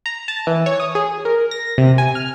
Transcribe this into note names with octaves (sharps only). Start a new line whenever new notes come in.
A#5
A5
E3
C#5
D#6
G#4
A#4
A#6
C3
G#5
F6